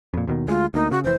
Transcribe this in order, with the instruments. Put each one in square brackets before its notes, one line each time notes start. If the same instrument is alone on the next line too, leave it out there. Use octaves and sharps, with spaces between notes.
[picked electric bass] F2 A#2
D#2 B2 D#3
[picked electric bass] D2 G#3 [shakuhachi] F4
[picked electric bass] D2 A#3 [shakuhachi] D#4
[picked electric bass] C#3 [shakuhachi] F#4
[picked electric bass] F1 E3 [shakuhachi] C5